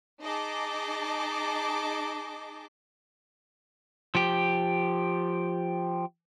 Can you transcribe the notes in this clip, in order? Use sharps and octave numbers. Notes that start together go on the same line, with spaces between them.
D#4 G#4 D#5 A5 D6
F3 G4